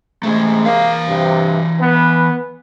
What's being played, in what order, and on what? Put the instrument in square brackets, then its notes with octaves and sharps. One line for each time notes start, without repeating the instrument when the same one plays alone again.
[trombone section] C3 G#3 [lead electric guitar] A3 C#4
[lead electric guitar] E3 F5 [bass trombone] A#3
[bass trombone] G2 [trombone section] C3
[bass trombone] B3 [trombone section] B4